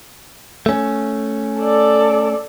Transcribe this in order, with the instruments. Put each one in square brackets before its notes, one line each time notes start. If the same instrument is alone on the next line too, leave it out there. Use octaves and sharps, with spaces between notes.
[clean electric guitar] A3 C#4
[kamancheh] A4 D5